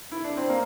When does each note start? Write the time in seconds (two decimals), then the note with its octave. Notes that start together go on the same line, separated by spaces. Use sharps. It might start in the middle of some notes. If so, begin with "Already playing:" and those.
0.12 E4
0.24 D4
0.37 C4
0.49 A#3